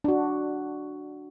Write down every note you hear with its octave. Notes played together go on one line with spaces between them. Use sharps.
D4 F#4